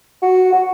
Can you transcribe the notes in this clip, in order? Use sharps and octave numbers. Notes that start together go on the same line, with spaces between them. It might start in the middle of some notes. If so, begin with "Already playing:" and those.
F#4
F#4